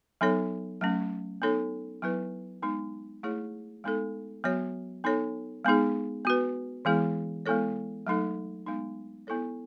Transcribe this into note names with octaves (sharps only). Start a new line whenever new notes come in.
F#3 B3 D#4 A4 C#5
F#3 A3 C#4
B3 D#4 A4 C#5
F#3 B3 E4 B4
G#3 B3 D#4
A3 E4 G#4 C#5
G#3 B3 D#4 A4
F#3 B3 F#4 C#5
B3 D#4 A4 C#5
G#3 B3 D#4 G#4
B3 F#4 B4
E3 G#3 B3 E4 G#4
G#3 B3 E4 A4 C#5
F#3 A3 D#4 A4
G#3 B3 D#4
B3 E4 A4 C#5